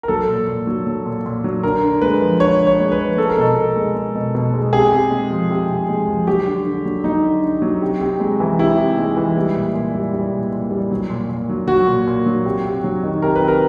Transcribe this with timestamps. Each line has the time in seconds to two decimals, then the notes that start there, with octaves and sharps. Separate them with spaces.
0.03 A#4
0.08 F#3 A4
0.28 A#2
0.47 A#2
0.67 F#3
0.87 F#3
1.06 A#2
1.25 A#2
1.44 F#3
1.63 D3 A#4
1.83 D3
2.02 G#3 B4
2.22 F3
2.40 D3 C#5
2.60 D3
2.67 C#5
2.80 G#3
2.92 B4
2.99 F3
3.17 G#3 A4
3.29 A#4
3.37 B2 A4
3.57 B2
3.76 G#3
3.95 G#3
4.15 B2
4.35 B2
4.54 G#3
4.73 C3 G#4
4.92 C3
5.11 G#3
5.30 F3
5.50 C3
5.69 C3
5.89 G#3
6.08 F3
6.27 F#3 G4
6.46 D3
6.65 D3
6.85 F#3
7.04 F#3 D#4
7.24 D3
7.43 D3
7.62 F#3
7.82 C3
8.01 C3
8.20 G#3
8.40 E3
8.59 C3 E4
8.78 C3
8.98 G#3
9.17 E3
9.37 G3
9.56 A#2
9.75 A#2
9.94 G3
10.13 G3
10.33 A#2
10.52 A#2
10.71 G3
10.91 F#3
11.10 A#2
11.29 A#2
11.49 F#3
11.68 F#3 F#4
11.88 A#2
12.07 A#2
12.26 F#3
12.45 C3
12.65 C3
12.84 F#3
13.04 D#3
13.22 C3 A#4
13.36 B4
13.42 C3
13.48 A#4